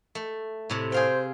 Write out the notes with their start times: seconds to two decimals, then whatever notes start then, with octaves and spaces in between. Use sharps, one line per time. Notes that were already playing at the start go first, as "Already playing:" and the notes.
0.15 A3
0.70 A2 C3 A3
0.92 G#4 C5 F5 G5